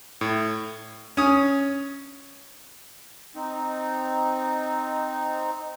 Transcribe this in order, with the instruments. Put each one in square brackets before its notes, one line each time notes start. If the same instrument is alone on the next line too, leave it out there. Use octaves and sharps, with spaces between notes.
[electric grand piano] A2
[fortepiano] C#4 D#6
[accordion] C4 D#4